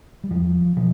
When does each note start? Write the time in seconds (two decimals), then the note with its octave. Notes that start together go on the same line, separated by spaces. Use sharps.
0.24 G3
0.30 E2 F3
0.76 B2 F3